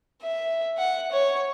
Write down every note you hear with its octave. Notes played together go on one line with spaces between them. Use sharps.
E5
F#5
C#5